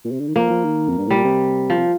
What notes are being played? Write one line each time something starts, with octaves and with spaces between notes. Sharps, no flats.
A#2
C3
D3
D#3
F3 A#3
F3
D#3
F2
G2
A2 G3
A#2
C3
F3
C3